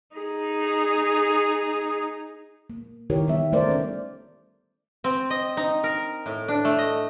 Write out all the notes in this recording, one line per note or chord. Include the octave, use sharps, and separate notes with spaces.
D#4 G#4
A#3
D#3 E4 G4 A#4 C#5
D#3 E3 G3 B3 E5
E3 G3 A3 A#4 C5 D5
C#4 D5
C4
D#5
D#4
A#4
A2
D4
A3
D#5